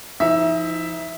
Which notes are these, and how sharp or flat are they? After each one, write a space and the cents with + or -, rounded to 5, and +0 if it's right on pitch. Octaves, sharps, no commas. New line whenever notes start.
F3 -30 D#4 +30 E5 +0